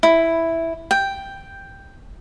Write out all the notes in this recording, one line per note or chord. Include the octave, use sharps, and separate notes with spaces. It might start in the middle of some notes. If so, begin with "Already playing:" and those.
E4
G5